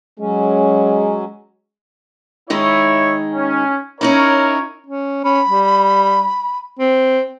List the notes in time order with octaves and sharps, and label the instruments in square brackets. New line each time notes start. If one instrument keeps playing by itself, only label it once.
[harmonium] F#3 C#4 [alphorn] G#3
[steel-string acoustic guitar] D#3 G#3 D#4 [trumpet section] E4 C#5
[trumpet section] C#4
[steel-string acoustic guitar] C#4 D#4 E4 [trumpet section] A#4 C#5
[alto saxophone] C#4
[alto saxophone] C#4 [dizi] B5
[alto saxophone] G3
C4